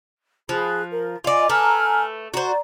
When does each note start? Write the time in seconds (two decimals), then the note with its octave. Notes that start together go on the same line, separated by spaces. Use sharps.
0.49 F3 G#4 B5 F#6
0.92 A#4
1.24 F4 D5 D#5 G#5
1.49 A3 B4 G#5 A#5 F6
2.34 F#4 C5 D5 A#5